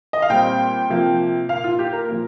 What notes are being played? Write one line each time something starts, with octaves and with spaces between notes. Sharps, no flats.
D#5
F5
A#2 G3 C4 G5
C3 F3 A#3
A#2 A#3 F5
F4
G4
A#4
A#2 F3 A#3